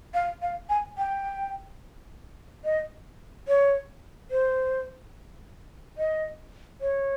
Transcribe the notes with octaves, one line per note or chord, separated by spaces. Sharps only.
F5
F5
G#5
G5
D#5
C#5
C5
D#5
C#5